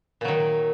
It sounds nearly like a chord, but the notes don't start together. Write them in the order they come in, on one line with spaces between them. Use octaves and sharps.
A#2 F#3 D#3